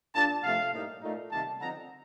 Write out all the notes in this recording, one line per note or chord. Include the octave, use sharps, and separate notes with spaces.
A#2 G3 D4 A5
C3 F3 A3 F5
A2 G3 A#3 D#4
A#2 A3 D#4
C3 D#3 G3 A#3 D#4 A5
D3 F3 C4 D#4 A#5